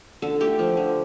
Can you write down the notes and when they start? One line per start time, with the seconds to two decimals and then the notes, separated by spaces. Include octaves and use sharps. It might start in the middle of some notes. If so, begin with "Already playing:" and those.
0.22 D3 A4
0.40 A3 G4
0.59 F3
0.77 D3